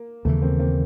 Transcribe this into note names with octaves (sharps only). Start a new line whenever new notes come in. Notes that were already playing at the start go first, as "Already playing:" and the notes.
Already playing: A#3
D#2 C#3 E3 A3 B3
A#3 C4
A#3 C4